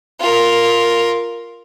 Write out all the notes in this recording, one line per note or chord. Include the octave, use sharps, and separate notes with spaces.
F4 A#4